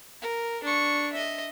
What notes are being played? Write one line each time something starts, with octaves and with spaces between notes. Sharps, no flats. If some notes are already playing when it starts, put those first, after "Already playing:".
A#4
D4 C#6
D#5 E5